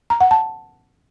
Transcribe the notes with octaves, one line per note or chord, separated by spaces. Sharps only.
A#5
F#5
A5